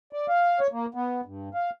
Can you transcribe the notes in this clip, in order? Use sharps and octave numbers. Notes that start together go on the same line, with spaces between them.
D5
F5
C#5
A#3
B3
G2
F5